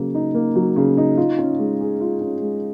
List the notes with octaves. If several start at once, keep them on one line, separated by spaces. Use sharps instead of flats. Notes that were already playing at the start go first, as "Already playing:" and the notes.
Already playing: C#3 F#3 A#3
D#4
A#3
F#3
C#3
D#4
F4
C#4
G#3
G#4
F4
C#4
G#3